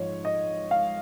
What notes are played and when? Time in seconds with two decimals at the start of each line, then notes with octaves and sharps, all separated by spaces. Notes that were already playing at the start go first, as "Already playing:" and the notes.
Already playing: G#2 F3 C#5
0.25 D#5
0.71 F5